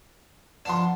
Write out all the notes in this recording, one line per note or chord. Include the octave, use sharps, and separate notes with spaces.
F3 B3 D4 C6 E7